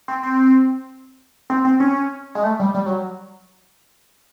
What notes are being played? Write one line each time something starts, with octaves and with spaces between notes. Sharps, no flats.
C4
C4
C4
C4
C#4
G#3
A3
G3
G3
F#3